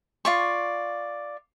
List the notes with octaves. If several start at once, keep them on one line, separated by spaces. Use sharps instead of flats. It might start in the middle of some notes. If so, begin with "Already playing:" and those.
F4 D5 C#6